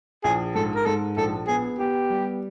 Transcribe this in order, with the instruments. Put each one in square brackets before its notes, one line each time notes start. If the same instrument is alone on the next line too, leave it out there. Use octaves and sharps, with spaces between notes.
[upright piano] A#1 [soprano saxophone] G#4
[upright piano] G#2 [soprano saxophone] A4
[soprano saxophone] A#4
[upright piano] G#2 [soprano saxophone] A4
[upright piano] A#1 [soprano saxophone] A4
[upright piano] B3 [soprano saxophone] G#4
[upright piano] B3 [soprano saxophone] G4
[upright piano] G3